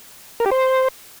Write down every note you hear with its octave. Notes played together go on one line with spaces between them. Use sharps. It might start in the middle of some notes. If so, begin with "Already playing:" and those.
A#4
G4
C5